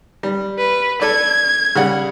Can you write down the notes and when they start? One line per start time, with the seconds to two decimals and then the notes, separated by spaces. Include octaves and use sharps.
0.23 G3
0.58 B4
1.02 A4 D5 G#6
1.75 C#3 G3 F#5